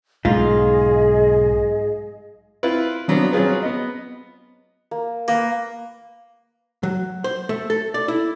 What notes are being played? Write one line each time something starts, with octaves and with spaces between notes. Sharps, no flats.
B1 G#2 F4 G#4 D#5
C4 E4 F4 B4
F3 F#3 B3 C4 D4
F#3 C4 C#4 F4 G#4 B4
B3 D#5
A#3
A#3 B4
F#3
C5
A3
A4
D5
E4